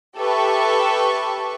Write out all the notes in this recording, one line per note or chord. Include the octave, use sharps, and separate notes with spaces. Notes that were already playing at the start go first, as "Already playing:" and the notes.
G4 A4 B4 E5 C#6